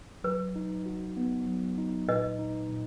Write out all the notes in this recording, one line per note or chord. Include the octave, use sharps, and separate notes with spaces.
F#3 B4
D#4
F#4
B3
F#3
D#4
A#2 B4 D#5
D#4
A#2